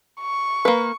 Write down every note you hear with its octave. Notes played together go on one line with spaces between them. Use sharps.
C#6
A#3 B4